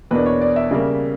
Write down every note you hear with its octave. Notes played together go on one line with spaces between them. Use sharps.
E2 B2 A#3 D4 B4
C#5
D5
E5
C#3 G3 A#3